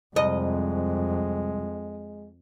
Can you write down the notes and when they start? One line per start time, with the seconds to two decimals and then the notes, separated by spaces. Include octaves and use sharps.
0.16 C2 F2 G#3 D#5